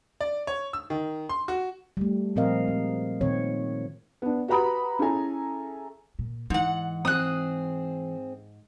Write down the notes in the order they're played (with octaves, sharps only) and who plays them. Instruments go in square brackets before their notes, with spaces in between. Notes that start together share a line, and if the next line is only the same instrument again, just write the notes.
[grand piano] D5
C#5
E6
D#3
C6
F#4
[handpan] G3 A3
A#2 F3 C4 A#4 D#5 F5
G#3
A#2 D#3 C4 C#5
[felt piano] B3 D4
F#4 G4 B4 A#5 B5 D#6
C#4 E4 G#4 A4 G#5 A#5
[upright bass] A#2
[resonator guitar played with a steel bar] G#2 F#5 [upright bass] E3
[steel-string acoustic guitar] C4 G#4 [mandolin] D#6 F#6